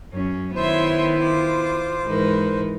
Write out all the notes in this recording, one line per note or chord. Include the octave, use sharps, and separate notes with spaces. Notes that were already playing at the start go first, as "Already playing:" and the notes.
F#2 C#4
D#3 B3 E4 C5 C#5 E5 C6
F4 D6
G#2 E3 D#4 A#4 B4